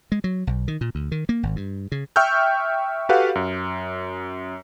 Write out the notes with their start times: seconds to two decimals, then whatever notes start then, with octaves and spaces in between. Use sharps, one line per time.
0.12 G#3
0.24 F#3
0.47 B1
0.68 D#3
0.81 A#2
0.95 D2
1.12 D#3
1.29 A#3
1.43 G#1
1.56 G2
1.92 C#3
2.16 E5 G5 C#6 E6 F6 G6
3.09 F#4 G4 A4 B4 F5 F#5
3.35 F#2